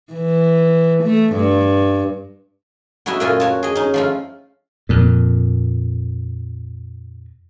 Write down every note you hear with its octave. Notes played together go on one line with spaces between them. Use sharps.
E3
A3
G2
F#3 C#4 E4 F#4 D#5 E5
F#2 A#2 A3 F4 D#5 G#5
F#4 C#5 A5
G#4 D#5
C#4 D#4
F3 A3 F4
F2 A#2